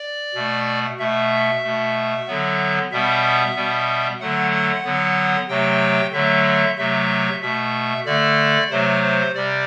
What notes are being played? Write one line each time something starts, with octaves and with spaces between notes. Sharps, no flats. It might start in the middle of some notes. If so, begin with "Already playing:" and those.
Already playing: D5
B2 A3
B2 A3 E5
B2 A3
D3 F#3 B3
B2 G3 B3 E5
B2 G3 B3
D3 F#3 A3 F#5
F#5
D3 F#3 B3
C3 F#3 A3 G5
D3 F#3 A3 E5
C3 F#3 A3 E5
B2 A3 E5
D3 A3 D5
C3 F#3 A3 C5
C5
C3 G3 D5